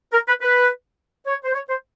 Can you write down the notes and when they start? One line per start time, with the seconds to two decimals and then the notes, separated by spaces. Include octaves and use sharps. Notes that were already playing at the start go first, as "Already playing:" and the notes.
0.12 A#4
0.27 B4
0.41 B4
1.25 C#5
1.44 C5
1.53 C#5
1.68 C5